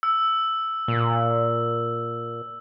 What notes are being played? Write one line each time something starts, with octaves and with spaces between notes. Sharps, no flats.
E6
A#2